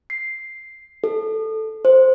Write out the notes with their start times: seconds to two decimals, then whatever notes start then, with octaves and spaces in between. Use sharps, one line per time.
0.10 C7
1.04 A4
1.85 C5